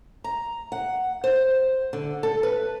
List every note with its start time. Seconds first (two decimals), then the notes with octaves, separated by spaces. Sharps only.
0.24 A#5
0.72 F#5
1.24 C5
1.93 D3
2.23 A4
2.43 B4